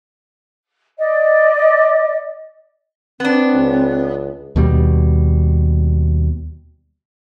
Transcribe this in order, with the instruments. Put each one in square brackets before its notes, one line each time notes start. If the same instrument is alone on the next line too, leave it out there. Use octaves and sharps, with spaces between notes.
[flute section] D5 D#5
[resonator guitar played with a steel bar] B3 D4 [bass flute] C4
[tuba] C#2
[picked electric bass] D#2 B2 G3